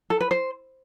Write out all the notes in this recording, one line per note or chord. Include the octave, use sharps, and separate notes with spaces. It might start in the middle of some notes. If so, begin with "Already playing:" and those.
A4
B4
C5